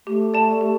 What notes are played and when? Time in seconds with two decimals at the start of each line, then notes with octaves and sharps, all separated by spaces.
0.07 A3 G4
0.34 D5 A5
0.61 G4